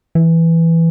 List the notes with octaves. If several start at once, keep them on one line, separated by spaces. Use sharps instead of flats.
E3